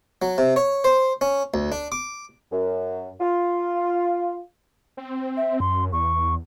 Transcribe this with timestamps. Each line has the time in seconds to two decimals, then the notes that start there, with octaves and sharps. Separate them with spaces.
0.22 F#3
0.38 C3
0.56 C#5
0.84 C5
1.21 C#4
1.54 D2
1.72 D4
1.92 D6
2.51 F#2
3.20 F4
4.97 C4
5.37 E5
5.60 F#2 C6
5.92 E2 C#6